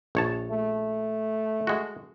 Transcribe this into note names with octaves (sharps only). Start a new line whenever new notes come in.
A#1 C#5 A5
A3
G#3 F#4